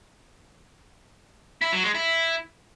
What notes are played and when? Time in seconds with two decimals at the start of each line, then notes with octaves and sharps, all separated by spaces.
1.61 E4
1.73 F#3
1.84 G#3
1.95 E4